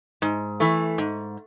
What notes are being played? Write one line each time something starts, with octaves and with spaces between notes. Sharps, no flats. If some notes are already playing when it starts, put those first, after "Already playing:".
G#2
E3 A3
G#2